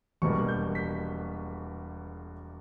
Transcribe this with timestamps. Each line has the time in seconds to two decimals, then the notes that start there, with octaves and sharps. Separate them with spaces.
0.22 E1 E2 B2 G3 A#3 C#6
0.48 G6
0.75 B6